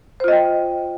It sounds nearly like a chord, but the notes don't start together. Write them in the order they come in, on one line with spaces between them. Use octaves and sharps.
C5 F4 D#5 G5